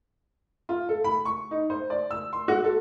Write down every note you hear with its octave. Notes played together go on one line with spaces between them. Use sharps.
F4
A4
B5
C#6
D#4
C5
D5
E6
C6
F#4
A4